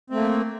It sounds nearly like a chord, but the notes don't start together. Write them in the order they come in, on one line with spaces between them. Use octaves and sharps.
C4 A3 A#3